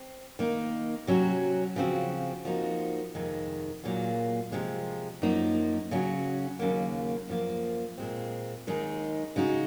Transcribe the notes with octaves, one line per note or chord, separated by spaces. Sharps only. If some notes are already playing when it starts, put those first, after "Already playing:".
Already playing: C4
D#3 A#3 D#4
C3 F#3 C#4 F#4
C#3 F3 C4 F#4
F3 A#3 D#4 F#4
F2 C3 D#3 G#3
A#2 F#3 A#3 F4 G#4
C3 F3 G#3
F#2 F3 A#3 D#4
C#3 F#3 C#4 F#4
D#2 C#3 F#3 A#3
F#2 F3 A#3
A#2 G#3 C4
D#2 D#3 G#3 D#4 G#4
C#3 G#3 D#4 F#4